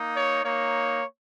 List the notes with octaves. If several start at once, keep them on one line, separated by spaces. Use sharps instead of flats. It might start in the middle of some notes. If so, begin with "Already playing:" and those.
Already playing: A#3 D#4
C#5
A#3 D#4 C#5